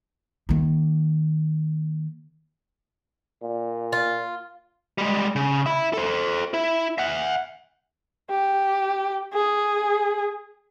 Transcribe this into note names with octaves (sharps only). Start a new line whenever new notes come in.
D#3 A#3
A#2
F4
G3 G#3
C#3
E5 B5
A4 C5
E4
E5 F#5
G4
G#4